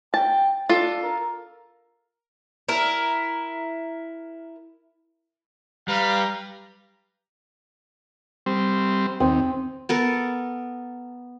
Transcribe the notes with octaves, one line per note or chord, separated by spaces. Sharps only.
G5 A5
D4 F4 A4
A#4
E4 A#4
G3 B4 F5 A#5
G3 C4
D#2 C4
B3 A4 A#4